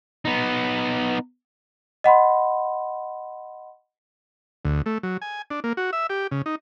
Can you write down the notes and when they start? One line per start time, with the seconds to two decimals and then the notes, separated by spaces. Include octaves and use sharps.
0.25 B3 D#4
2.04 D#5 F#5 B5 C6
4.65 D2
4.86 A3
5.03 F#3
5.22 G#5
5.51 D4
5.64 A#3
5.77 F#4
5.93 E5
6.10 G4
6.31 C#3
6.46 D#4